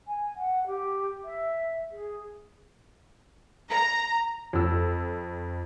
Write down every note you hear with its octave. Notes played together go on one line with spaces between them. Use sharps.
G#5
F#5
G4
E5
G#4
A#5
F2 E6